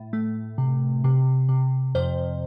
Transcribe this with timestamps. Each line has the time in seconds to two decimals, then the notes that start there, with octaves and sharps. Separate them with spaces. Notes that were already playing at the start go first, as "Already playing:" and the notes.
Already playing: A2
0.13 A3
0.58 C3
1.04 C3
1.49 C3
1.95 F2 C5